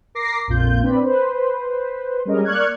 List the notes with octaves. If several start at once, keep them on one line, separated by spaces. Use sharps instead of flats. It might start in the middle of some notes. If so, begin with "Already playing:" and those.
A#4 D6 A#6 C7
A#1 F2 A#2 F4 G6
C4 D4 B4 D5 B5
B4 C5
G3 G#3 C#4 A#4 D#5
A#3 D5 C#6 F6 F#6 G#6